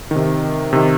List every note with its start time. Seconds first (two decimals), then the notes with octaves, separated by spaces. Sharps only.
0.11 C3 D#3
0.73 C3 D#3